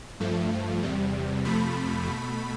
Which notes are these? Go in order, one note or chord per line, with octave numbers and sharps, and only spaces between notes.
G2 F3 A3
E2 C3 G3
F2 C3 F3 A3 B5
B2 A3